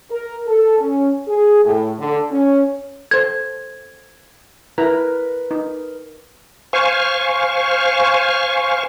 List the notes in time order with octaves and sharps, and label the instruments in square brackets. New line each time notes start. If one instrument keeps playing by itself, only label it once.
[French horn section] A#4
A4
C#4
G#4
A2
D3
C#4
[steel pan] A4 C5 [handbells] G#6
[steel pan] E4 A#5 [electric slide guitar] A#4 B4
[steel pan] D#4
[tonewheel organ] C5 F5 G#5 C#6